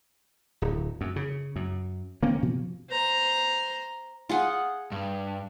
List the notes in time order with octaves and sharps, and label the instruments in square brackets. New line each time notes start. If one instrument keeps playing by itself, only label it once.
[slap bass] D1
F#2
C#3
F#2
D#3 A#3 C4 C#4
B2 F3
[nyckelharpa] C5 A#5
[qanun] F4 G#4 F#5
[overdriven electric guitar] G2